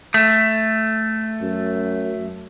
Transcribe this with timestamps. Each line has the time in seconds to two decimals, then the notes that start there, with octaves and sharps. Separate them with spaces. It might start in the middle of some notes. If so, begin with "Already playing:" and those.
0.14 A3
1.42 F#2